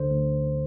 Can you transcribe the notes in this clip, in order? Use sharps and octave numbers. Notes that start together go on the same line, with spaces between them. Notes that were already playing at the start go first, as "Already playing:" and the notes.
Already playing: D2 D3 C5
D2